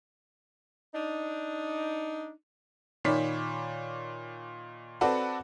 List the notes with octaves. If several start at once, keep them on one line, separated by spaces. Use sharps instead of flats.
D4 D#4
A#2 D#3 C#5 D5 B5 B6
C4 F#4 A4 B4 D5 F#5